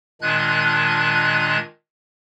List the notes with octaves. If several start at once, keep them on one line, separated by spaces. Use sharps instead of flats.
A#2 D#3 G#3 D4 F#6 G#6